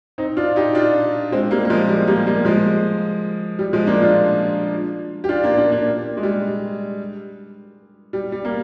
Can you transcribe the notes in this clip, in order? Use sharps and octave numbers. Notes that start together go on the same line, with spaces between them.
C4 D#4
D4 F4
D#4 G4
D4 F4
G#3 C4
G3 A#3
A#3
F3 G#3
G3
G3 A#3
G3 A#3
F3 G#3
G3
F3 G#3
A#3 D4
D4 F4
G4
D4 F4
A#3 D4
A#3 D4
A#3 D4
G#3
G3
G3
G3
A#3